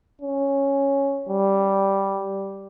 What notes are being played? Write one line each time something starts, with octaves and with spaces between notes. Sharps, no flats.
C#4
G3